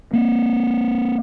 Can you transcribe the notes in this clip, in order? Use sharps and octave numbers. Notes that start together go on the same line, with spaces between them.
A#3 C4